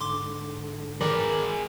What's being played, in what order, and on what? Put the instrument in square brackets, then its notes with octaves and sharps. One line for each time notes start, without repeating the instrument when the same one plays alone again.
[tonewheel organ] G#2 D3 [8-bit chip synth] C6 D6
[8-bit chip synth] D#3 E3 [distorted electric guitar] G#3 B5 [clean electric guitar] A#4 D5